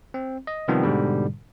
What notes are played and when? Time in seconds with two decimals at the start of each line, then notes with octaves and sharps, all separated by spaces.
0.14 C4
0.47 D#5
0.68 C3 D#3 F3 G3 B3 C4
0.83 G#2 B2 D3 G3